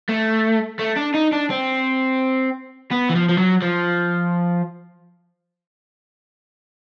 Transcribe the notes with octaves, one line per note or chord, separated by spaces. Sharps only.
A3
A3
D4
D#4
D4
C4
B3
E3
F3
F3
F#3
F3